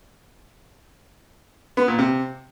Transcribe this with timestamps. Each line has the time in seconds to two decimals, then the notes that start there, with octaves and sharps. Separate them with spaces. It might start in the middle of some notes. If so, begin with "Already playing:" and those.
1.77 B3
1.88 A#2
1.99 C3